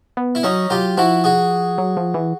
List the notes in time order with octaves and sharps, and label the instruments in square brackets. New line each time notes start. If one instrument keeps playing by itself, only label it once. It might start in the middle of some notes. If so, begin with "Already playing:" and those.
[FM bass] B3
[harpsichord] E4
[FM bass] F#3 [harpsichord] C#4 D#4
[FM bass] F#3 [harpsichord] F4 G4
[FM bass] F3 [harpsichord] E4 F#4
[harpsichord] F#4 G#4
[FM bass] F#3
F3
E3